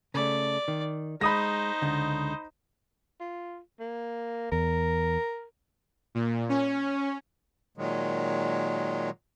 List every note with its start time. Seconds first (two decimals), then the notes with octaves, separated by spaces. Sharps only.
0.14 C#3 A3 D5
0.68 D#3
1.21 G#3 D#4 C5 B5 D#6 A#6
1.82 C#2 D3
3.20 F4
3.80 A#3
4.52 E2 A#4
6.15 A#2
6.49 C#4
7.77 A#2 D#3 F#3 G#3